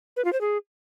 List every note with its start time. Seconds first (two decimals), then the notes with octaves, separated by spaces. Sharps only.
0.16 B4
0.25 F4
0.33 C5
0.41 G#4